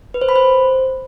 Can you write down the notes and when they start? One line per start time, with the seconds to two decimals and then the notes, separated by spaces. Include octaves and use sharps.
0.14 B4
0.21 C5
0.29 B5
0.36 C5